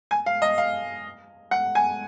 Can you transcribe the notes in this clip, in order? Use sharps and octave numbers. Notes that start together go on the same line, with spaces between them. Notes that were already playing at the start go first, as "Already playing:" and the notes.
G#5
F5
D#5
F5
F#5
G#5